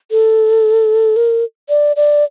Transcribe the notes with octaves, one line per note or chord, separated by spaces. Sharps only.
A4
A#4
D5
D5